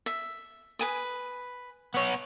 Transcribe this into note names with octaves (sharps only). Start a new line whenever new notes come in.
E5
B4 G#5 D#6
B3 C#5